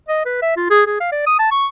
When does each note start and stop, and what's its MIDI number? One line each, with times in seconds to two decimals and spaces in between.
0.09 0.24 75
0.26 0.38 71
0.42 0.57 76
0.57 0.70 65
0.70 0.83 68
0.87 0.98 68
1.00 1.08 77
1.12 1.24 74
1.27 1.35 87
1.39 1.50 81
1.51 1.66 85